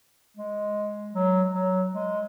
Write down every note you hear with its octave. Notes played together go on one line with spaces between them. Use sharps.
G#3
F#3
F#3
G#3